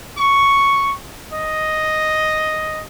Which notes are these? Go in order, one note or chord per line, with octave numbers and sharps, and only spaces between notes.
C#6
D#5